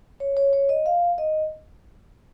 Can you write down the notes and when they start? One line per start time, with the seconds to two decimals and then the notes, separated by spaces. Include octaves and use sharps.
0.20 C#5
0.37 C#5
0.53 C#5
0.69 D#5
0.86 F5
1.18 D#5